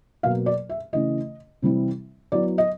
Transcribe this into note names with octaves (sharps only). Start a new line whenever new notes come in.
B2 F#3 A#3 F5
D5
E5
C#3 E3 A3 D#5
C3 E3 G3 C4 E4
F#3 B3 E4 D5
D#5